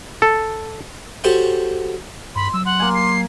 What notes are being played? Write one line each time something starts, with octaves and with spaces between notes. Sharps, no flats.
A4
F#4 G4 A4 C5 C#5 F#5
G2 B5 C6
F#3 E6
F#5 C6
A#3 G#5
C7